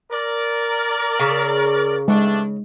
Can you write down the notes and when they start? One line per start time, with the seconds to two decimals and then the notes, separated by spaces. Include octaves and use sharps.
0.12 A#4 D5
1.19 C#3
2.08 G2 G#3 A3 D4